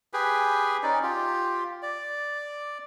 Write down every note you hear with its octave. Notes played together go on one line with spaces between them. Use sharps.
G4 G#4 B4
C#4 D#4 D5
F4 G4
D5